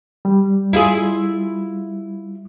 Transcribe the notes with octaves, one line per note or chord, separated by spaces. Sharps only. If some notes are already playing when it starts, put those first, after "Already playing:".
G3
E4 F4 G#4